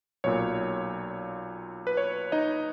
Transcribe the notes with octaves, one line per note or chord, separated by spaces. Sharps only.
B1 A#2 C#5
B4
C#5
D#4 D#5